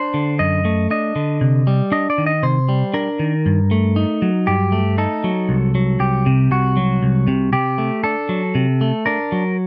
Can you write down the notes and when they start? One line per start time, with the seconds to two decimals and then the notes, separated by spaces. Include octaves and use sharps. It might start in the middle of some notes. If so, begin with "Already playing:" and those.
Already playing: D4 C5
0.14 D3
0.39 F#2 D#5
0.65 A3
0.91 D4 D#5
1.16 D3
1.41 C3
1.67 G3
1.92 D4 D#5
2.10 D5
2.18 D#3
2.26 D#5
2.43 C3 C5
2.69 G3
2.94 D4 A#4
3.19 D#3
3.46 G2
3.71 A3
3.96 D#4
4.22 F#3
4.47 G2 G4
4.72 A3
4.98 D#4 A4
5.24 F#3
5.49 C2
5.75 F#3
6.00 C2 G4
6.26 C3
6.51 C2 F#4
6.77 F#3
7.03 C2
7.28 C3
7.53 C3 G4
7.78 A3
8.04 D4 A4
8.29 F#3
8.55 C3
8.81 A3
9.06 D4 A#4
9.32 F#3